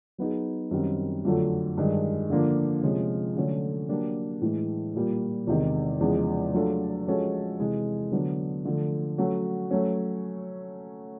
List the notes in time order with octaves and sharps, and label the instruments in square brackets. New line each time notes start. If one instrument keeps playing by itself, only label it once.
[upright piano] F#3 B3 D#4 G#4
F#2 D#3 G3 C4
F2 D3 F#3 A3
G2 D#3 G#3
D3 F3 A#3 D4 F4
C3 F3 G#3 C#4
D3 F#3 A3 C#4
F#3 A#3 D4 G4
A2 E3 G#3
A#2 G3 A#3
E2 C3 D#3 G#3
E2 C#3 F3 G#3
F#3 A3 D4 F4 A4
F3 G#3 C#4 F#4 A4
C3 E3 G#3
D3 F#3 B3 D4
D3 F3 A3
F#3 A3 C#4 F#4
F#3 A3 C#4